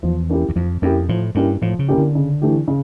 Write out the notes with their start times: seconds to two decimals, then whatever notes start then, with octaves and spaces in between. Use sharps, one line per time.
0.03 E2 F3
0.29 A#3 C#4 E4 G4
0.49 E2
0.56 F2 F3
0.82 F2 A#3 C#4 E4 G4
1.09 A2 F3
1.35 G2 A#3 C#4 E4 G4
1.62 A2 F3
1.79 C#3
1.88 A#3 C#4 E4 G4
1.98 D3
2.15 C#3
2.42 E3 A3 D4 G4
2.68 C#3